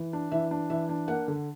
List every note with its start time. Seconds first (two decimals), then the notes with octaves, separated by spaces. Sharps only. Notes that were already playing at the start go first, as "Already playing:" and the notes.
Already playing: E3
0.13 D4
0.31 E3 E5
0.51 D4
0.70 E3 E5
0.89 D4
1.08 A#3 F#5
1.28 D3